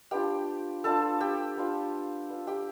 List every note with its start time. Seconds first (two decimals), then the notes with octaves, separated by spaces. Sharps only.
0.11 B3 D4 F4 G4 G5
0.84 B3 D4 F4 A4 A5
1.20 G4 G5
1.57 B3 D4 F4
2.29 B3 D4 F4
2.47 G4 G5